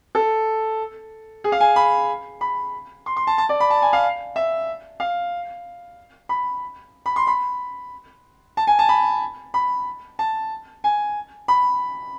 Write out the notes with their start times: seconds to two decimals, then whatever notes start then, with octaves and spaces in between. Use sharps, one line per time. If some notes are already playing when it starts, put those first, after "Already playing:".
0.15 A4
1.44 G#4
1.52 F5
1.60 G#5
1.76 B5
2.41 B5
3.06 C6
3.17 C6
3.27 A5
3.38 A5
3.49 D5
3.60 B5
3.70 A5
3.82 G#5
3.93 F5
4.36 E5
5.00 F5
6.29 B5
7.06 B5
7.16 C6
7.27 B5
8.57 A5
8.67 G#5
8.79 A5
8.89 B5
9.54 B5
10.19 A5
10.84 G#5
11.48 B5